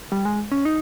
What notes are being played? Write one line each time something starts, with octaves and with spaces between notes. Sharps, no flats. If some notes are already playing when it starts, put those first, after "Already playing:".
G3
G#3
C#4
D#4